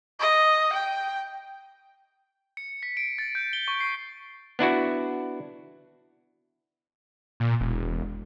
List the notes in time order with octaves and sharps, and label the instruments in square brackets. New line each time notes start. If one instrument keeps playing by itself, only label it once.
[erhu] D#5
G5
[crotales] C#7
B6
D7
A6
G6
G7
C#6
C7
[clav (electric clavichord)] B3 D4 E4 F#4
[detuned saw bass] A#2
E1